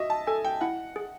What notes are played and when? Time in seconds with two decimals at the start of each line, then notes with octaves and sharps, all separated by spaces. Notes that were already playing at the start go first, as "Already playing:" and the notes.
Already playing: F#4 D#5 E5
0.10 A5
0.27 A4 G#5
0.44 G5
0.61 E4 F#5
0.96 G#4